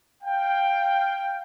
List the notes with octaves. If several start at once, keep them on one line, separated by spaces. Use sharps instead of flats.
F5 G5